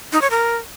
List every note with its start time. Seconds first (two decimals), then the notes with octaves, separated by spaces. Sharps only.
0.12 D#4
0.22 C#5
0.31 A#4